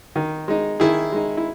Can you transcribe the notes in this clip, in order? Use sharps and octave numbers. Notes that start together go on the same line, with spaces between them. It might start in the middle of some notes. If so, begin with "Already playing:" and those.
D#3
G#3 D#4
D#3 E4 G#4
G#3 D#4
E4